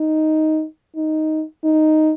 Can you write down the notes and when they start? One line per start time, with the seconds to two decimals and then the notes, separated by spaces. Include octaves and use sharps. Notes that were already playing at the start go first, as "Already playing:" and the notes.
Already playing: D#4
0.96 D#4
1.64 D#4